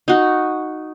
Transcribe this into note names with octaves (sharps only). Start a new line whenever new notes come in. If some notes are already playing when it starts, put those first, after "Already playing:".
D#4 F#4